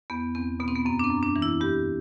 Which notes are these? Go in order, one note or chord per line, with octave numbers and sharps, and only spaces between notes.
E2 B3
E2 C4
B2 B3
C4
B3
F#2 C4
D4
C4
F#2
D4
E3
E4
G2 G4